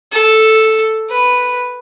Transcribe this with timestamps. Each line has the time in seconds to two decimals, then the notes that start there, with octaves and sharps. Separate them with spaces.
0.12 A4
1.09 B4